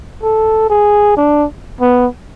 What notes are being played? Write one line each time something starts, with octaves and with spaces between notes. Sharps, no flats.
A4
G#4
D4
B3